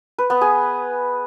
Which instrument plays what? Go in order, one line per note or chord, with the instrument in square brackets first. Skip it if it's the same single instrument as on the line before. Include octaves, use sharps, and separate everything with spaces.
[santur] B4
B3
G#4